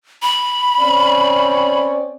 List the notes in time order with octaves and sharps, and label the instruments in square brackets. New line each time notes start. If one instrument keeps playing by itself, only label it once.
[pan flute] B5
[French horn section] C4 C#4 D5